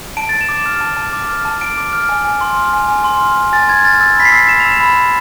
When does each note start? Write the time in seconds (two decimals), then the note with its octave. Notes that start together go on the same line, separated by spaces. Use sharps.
0.17 A5 D7
0.29 A5 A6
0.41 E7
0.49 D6
0.66 F6
0.81 A5
0.97 A5
1.13 D6
1.29 F6
1.45 A5
1.61 A5 D7
1.78 D6
1.93 F6
2.09 G#5
2.25 G#5
2.41 C6
2.57 F6
2.73 G#5
2.88 G#5
3.04 C6
3.21 F6
3.37 G#5
3.53 G#5 A6
3.68 C6 G#6
3.84 F6 A6
4.01 E6 A6
4.17 B5 B6
4.25 C7
4.32 E6
4.49 B5 E7
4.60 F7
4.65 E6
4.72 E7
4.80 B5
4.96 E6